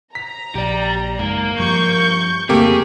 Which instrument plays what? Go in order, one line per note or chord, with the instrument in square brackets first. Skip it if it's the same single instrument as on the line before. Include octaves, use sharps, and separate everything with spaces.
[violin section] A#5 [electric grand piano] B6
[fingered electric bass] A#1 [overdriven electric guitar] G4 D5
[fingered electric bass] F#1 G#2 [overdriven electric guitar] A#3 A#4
[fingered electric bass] G2 F3 G3 [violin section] C#6 G6
[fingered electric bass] F2 C#3 C4 [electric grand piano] A3 A#3 G4 [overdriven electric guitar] G#4